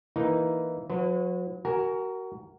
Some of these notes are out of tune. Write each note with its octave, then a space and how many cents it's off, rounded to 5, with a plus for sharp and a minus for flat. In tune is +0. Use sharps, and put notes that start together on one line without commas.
E3 +0 A#3 +0 D#4 +0
F#3 -35 B4 +35
F#4 +25 A#4 -5 G#5 +0